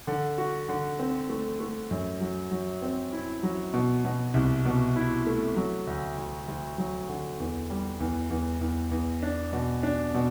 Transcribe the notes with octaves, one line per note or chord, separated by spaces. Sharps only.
D3
F#4
D3
C4
A3
A3
F#2
F#3
F#3
C4
E4
F#3
B2
B2
C2
B2
E4
A3
F#3
D2
D2
D2
F#3
D3
E2
G3
E2
E2
E2
E2
D4
B2
D4
B2